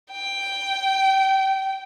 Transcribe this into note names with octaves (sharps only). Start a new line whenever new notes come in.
G5